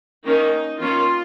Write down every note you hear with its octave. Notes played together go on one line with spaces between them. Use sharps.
D#3 A#3 C#4 D#4
D#3 A#3 C#4 F4